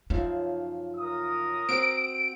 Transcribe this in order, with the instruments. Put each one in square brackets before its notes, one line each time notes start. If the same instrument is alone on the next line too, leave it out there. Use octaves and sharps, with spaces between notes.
[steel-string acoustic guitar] F#2 C#3 F3 [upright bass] D#4 F4
[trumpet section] A#4 D#6
[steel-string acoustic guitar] C4 F#4 C5 [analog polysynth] D7